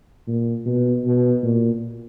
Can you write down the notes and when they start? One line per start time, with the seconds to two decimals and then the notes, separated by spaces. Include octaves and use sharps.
0.27 A#2
0.66 B2
1.05 B2
1.43 A#2